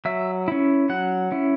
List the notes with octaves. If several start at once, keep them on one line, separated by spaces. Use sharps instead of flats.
F#3 E5
C#4 E4
F#3 F#5
C#4 E4